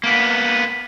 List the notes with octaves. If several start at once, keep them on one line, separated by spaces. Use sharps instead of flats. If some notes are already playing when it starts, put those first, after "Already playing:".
A#3 B3